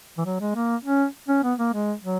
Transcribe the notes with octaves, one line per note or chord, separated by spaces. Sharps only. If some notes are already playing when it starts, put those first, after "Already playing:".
E3
F#3
G#3
A#3
C#4
C#4
B3
A#3
G#3
F#3